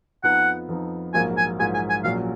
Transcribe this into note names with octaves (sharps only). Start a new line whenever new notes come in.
F2 F3 B3 D#4 F#5
F2 F3 B3 D#4
A#1 G#2 F#3 A#3 F4 G#5
G#5
A#1 G#2 F#3 A#3 F4 G#5
G#5
G#5
A#1 A#2 F#3 C#4 F5